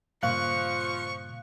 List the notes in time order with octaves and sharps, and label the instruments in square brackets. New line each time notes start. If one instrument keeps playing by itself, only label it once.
[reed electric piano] G2 A#2 C#3 [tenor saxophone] F3 [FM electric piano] F5 F#6 [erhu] C#6